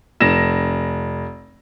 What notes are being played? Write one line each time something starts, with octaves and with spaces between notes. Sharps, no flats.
F1 A#6 E7